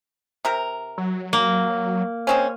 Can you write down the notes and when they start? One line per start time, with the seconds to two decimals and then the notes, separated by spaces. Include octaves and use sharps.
0.45 C3 A#4
0.98 F#3
1.33 A#3
2.27 G#3 C4 C#4